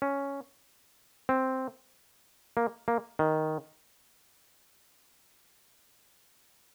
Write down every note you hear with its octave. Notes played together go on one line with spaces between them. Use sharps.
C#4
C4
A#3
A#3
D#3